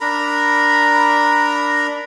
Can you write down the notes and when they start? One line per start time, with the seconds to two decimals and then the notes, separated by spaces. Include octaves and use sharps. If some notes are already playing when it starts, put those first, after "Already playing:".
0.01 D4 A#4 A#5 B5